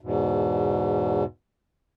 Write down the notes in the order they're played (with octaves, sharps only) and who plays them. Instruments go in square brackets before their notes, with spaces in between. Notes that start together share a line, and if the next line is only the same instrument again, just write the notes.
[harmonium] E2 G#2 B2